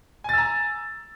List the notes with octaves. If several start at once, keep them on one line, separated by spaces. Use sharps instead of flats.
G#5 A#5 E6 A6